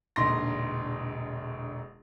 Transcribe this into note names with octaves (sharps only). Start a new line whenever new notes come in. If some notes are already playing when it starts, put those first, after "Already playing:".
E1 A#1 D3 D#4 C6 A#6